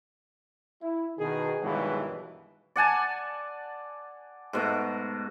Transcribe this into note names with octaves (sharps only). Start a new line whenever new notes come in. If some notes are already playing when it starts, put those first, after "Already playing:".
E4
B2 D#3 G#4
G2 B2 D#3 E3 F#3 G#3
D5 F#5 G#5 A5
G#2 B2 A3